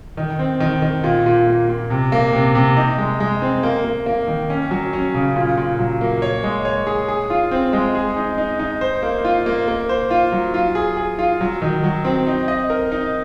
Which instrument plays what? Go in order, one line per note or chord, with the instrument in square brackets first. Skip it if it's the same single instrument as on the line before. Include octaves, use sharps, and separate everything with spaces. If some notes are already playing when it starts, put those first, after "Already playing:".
[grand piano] D#3
C4
D#3
D#3
A#2
A#2
A#3
A#2
C3
A#3
C3
C3
D#4
G#3
G#3
C4
A#3
A#3
A#3
D#3
C#4
F#3
C#4
C#3
A#2
A#2
F#3
A#3
C#5
G#3
C#5
G#4
G#4
F4
C4
G#3
G#4
D#4
D#4
D#4
C5
A#3
F4
A#3
A#3
C5
F4
F#3
F4
G#4
G#4
F4
F#3
D#3
F#3
C4
D#4
D#5
A#4
D#4